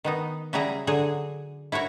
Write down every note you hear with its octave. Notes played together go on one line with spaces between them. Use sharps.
D#3 B3 D#4
C#3 F#3 G3 E4 G#4 A#5
D3 F#3 G#4
E4 F#4 A#4 C#5